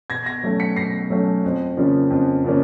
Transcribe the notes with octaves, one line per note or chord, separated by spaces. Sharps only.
B2 G#6 A#6
G#6 A#6
F#3 A3 C#4
B6 C#7
B2 A#6 C7
F#3 A3 C#4
F2
C#3 F3 A#3 C#4
F2
C#3 F3 A#3 C#4